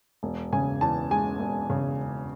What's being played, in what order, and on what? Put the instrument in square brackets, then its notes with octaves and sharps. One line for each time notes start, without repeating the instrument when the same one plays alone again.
[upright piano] E1
C#3 G#5
E2 A5
G#3 G#5
E1
C#3